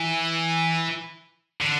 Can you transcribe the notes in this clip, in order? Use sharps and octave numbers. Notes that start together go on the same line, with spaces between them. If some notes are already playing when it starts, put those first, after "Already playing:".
Already playing: E3
D3